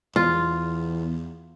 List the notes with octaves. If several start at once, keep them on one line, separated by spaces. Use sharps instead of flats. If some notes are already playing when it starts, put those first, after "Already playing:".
E2 F4